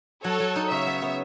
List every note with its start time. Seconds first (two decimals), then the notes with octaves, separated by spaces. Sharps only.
0.24 F#3 A4 C#5
0.40 F#3
0.56 D#4
0.70 C#3 C#5 E5
0.87 B3
1.02 B3